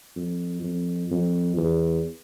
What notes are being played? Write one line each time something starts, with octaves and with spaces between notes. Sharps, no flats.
F2
F2
F2
E2